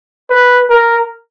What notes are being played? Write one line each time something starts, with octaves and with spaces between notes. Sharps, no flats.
B4
A#4